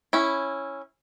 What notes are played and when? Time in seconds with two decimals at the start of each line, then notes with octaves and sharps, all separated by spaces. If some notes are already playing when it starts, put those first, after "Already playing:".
0.13 C#4 E4